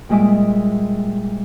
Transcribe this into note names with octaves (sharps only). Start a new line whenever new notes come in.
A#2 G3 G#3 D#5 E5 D6